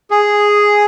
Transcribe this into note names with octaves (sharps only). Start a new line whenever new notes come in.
G#4